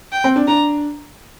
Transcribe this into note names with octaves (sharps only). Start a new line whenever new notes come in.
G5
C4
D4
D4 A#5